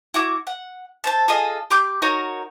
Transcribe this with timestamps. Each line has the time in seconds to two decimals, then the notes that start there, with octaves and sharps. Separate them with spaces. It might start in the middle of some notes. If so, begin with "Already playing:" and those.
0.14 E4 F#4 D6
0.47 F#5
1.04 A4 C5 A5
1.28 F4 G#4 A4 D#5
1.70 G4 C6 D6 G6
2.02 D#4 F#4 A#4 C#5